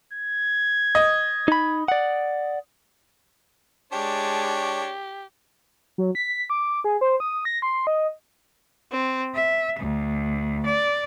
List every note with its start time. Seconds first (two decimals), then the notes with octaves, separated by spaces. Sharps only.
0.14 G#6
0.95 D#5
1.48 D#4 B5
1.88 D5 F#5
3.93 G#3 D4 G4 C#5 A5
5.98 F#3
6.15 B6
6.50 D6
6.84 G#4
7.01 C5
7.20 D#6
7.45 A#6
7.62 C6
7.87 D#5
8.91 C4
9.34 E5
9.79 D2
10.65 D5